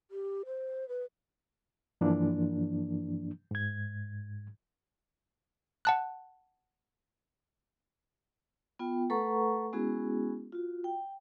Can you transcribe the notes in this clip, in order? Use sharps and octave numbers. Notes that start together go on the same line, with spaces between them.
G4
C5
B4
G2 E3 F3 A#3 D4
G#2 G#6
F#5 A5 F#6
B3 F4 G5
A3 A4 B4 F#5 A#5 C#6
G#3 B3 C#4 E4 F#4 G#4
F4 F#4
G5